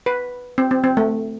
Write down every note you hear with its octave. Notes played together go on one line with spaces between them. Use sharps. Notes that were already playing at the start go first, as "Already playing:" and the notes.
B4
C4
C4
C4
A3